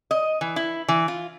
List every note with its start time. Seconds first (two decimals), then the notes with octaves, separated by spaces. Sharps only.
0.11 D#5
0.41 E3
0.56 E4
0.88 E3
1.08 F4